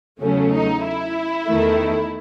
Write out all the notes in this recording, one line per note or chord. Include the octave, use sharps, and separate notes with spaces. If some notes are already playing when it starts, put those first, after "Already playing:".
E2 C#3 F#3 A3 C#4
D#4
E4
E2 D#3 A3